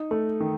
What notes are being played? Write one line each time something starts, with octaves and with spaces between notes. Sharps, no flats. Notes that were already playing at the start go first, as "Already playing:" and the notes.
Already playing: D#4
A3
D#3